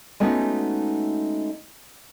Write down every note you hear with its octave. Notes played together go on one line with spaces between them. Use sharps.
G#3 A3 B3 C#4 D#4 F#4